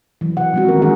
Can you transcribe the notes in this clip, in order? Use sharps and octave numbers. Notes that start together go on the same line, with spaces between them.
E3 F#3
C3 F#5
E3 F3 G3 G#3 C4 F#4
D#3 A#3 C#4 A#4
D3 E3 D4 F4 G#4 F#5